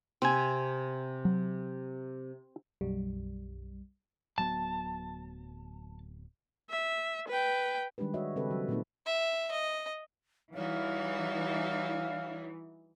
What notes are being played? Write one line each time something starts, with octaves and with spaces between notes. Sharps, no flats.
C3 C4 G#5
F#3
B1 F#2 G3
D1 F#3 B3 A5
E5
B4 G5
D#3 G3 G#3 D4 G4 B4
F#4 C#5 D#5 E5
C#3 C4 G4 A4 B4
F#3
A#2 A3 A#3 C4 D#4 B4
E5
D#5
E3 G3 D#4 F#4 C#5 F5